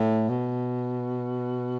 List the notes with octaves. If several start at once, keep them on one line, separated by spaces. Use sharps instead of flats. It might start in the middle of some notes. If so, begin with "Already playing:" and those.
Already playing: A2
B2